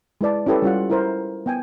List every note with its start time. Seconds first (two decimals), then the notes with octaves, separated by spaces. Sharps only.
0.21 G#3 E4 B4 D5 A5
0.46 C#4 E4 G4 A4 B4
0.62 G3 C#4 F4 F#5
0.90 E4 A#4 C5
1.46 B3 G5 G#5